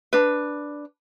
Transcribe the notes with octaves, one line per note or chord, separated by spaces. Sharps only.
D4 B4